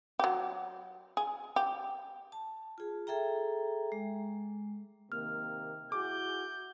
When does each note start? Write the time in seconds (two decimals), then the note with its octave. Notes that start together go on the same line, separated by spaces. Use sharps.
0.19 F#3 G4
1.17 G#4
1.56 G4
2.32 A5
2.78 F4 G#4
3.07 G#4 A4 E5 G5 A#5
3.92 G#3
5.12 C3 D#3 A#3 F6
5.92 E4 F#4 G#4 D6 G6